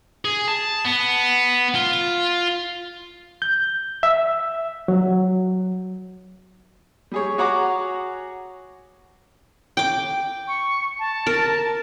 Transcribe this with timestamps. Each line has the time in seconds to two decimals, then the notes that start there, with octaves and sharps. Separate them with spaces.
0.25 G#4
0.48 A5
0.85 B3
1.75 F4
3.42 G6
4.03 E5
4.88 F#3
7.12 G3 G#4 C#5
7.38 F#4 G#4 C#5 F#5 A#5 D6
9.77 G5 D6
10.48 C#6
10.99 A5
11.27 A#4